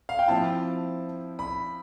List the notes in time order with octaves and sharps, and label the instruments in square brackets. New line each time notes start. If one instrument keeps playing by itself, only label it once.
[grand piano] F5
G5
[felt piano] F3 C4 E4 [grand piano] A5
[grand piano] B5